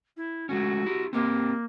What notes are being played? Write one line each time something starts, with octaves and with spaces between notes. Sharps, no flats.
E4
G#3 A3 C#4 F#4
E4 G4
A#3 C4 G4 D#5